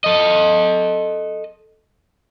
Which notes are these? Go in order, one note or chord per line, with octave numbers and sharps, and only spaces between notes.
A4 D#5